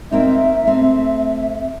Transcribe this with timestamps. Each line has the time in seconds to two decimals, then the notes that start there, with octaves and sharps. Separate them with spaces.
0.11 A#3 C4 D#4 E5
0.66 A3 C4